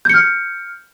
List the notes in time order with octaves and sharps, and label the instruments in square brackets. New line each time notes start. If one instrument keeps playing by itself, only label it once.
[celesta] G6
C#7
F6